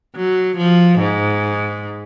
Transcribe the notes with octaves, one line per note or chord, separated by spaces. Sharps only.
F#3
F3
G#2